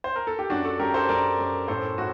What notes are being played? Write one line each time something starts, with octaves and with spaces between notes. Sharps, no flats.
C5
A#4
A4
G4
F#2 D4 F#4
F#4 A4
F#2 G4 A#4
A4 C5
F#2 A#4 D5
F#2
A2 A4 C5
A2 F#4